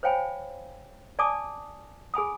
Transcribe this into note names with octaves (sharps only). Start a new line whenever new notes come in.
C5 C#5 F5 G5 G#5 B5
D5 G#5 A5 D6 D#6
G#4 G#5 B5 D#6